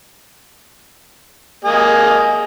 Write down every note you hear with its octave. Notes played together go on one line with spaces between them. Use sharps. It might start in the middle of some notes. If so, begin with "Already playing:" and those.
A#3 G#4 D#5